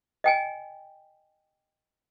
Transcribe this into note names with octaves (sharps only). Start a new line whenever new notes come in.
D#5 G5 G#5